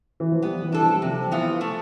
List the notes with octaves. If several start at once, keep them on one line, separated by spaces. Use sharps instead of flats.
E3
F3
G3 B3
E3
D4 A4
F3
G3
C3 F3
E3 B3 F4
A3